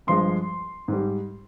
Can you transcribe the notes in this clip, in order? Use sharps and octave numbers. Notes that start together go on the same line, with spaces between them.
G2 F3 G#3 C6
G#2 G3